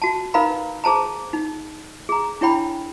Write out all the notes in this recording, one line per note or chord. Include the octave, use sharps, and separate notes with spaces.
F#4 A5
D#4 A#4 B4 F5 A#5 B5
G#4 C5 A5 A#5
D#4
G#4 A#5
D4 E4 C#5 G5 B5